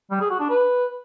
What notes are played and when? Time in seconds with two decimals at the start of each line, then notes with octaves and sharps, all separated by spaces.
0.11 G3
0.21 G#4
0.30 F#4
0.40 D4
0.50 B4